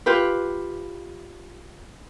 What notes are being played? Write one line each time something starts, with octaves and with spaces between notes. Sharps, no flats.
F4 G4 B4